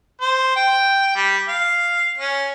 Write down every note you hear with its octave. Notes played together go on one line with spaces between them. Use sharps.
C5
G5
G3
F5
C#4